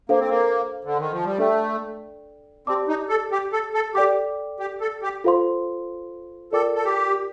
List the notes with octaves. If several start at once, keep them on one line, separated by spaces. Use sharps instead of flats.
A#3 D4 A4 C5 F5
C4
A#3
D3
D#3
F3
G3
A3 D4 A4 D5 G5
C4 G4 D5 A5 D6
D#4
A4
G4
A4
A4
G4 A4 D5 G5 D6
G4
A4
G4
F4 A4 C5 F5 C6
F4 A4 A#4 D5 G5 D6
A4
G4